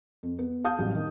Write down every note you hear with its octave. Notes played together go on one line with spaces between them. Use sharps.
F2
B3
F5 A5 D#6 G6
A1 F#3 G3
D#3